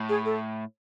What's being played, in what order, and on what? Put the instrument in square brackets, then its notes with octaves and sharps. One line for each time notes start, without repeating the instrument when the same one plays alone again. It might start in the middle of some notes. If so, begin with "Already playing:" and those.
Already playing: [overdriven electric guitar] A2
[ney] G#4
A4